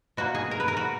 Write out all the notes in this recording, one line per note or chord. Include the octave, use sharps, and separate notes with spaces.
B2 A#3 F#4
G#4
A#4
B4
A#4
F#4